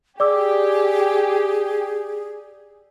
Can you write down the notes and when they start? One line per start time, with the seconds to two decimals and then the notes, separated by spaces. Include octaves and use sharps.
0.20 G4 G#4 D5 D6 E6